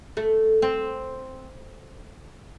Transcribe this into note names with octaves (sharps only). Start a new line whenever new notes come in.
A3
C4